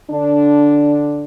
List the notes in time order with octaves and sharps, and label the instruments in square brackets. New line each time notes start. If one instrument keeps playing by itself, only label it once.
[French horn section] D3 D4